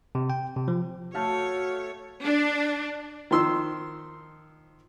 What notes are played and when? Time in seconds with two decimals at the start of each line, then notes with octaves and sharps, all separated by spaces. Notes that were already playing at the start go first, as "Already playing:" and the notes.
0.15 C3
0.30 G5
0.56 C3
0.68 F3
1.15 A3 F#4 A4 C#5 F5
2.24 D4
3.31 D#3 F3 C6 E6